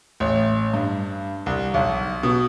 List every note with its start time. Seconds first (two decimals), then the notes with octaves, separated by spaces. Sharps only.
0.20 A1
0.74 G2
1.46 C2
1.74 B1
2.23 B2